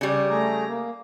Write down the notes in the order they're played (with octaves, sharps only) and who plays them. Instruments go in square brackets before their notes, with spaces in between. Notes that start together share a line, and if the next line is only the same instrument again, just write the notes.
[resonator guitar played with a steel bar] C#3 G3
[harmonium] A3 G#4 A#5
A#3